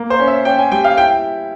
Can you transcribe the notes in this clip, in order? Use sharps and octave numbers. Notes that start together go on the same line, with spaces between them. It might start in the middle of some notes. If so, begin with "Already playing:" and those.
Already playing: A#3
C5
C#4
E5
C#4 G5
G#5
G3 G5
F5
E4 G5